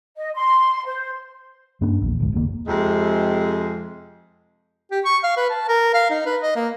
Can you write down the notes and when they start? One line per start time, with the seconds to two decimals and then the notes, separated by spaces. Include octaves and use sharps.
0.16 D#5
0.34 C6
0.86 C5
1.81 G2 A#3 C#4 D4
2.02 A#1 E2
2.20 D2 G#2
2.33 F#1 D#2 A#3
2.67 F2 C3 G#3
4.91 G4
5.05 C#6
5.24 F5
5.37 B4
5.50 A5
5.68 A#4
5.94 F5
6.10 D#4
6.26 B4
6.43 D#5
6.56 A#3